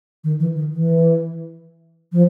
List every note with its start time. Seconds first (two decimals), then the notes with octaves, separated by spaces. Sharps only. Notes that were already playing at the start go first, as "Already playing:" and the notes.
0.24 D#3
0.40 E3
0.56 D#3
0.71 E3
2.12 F3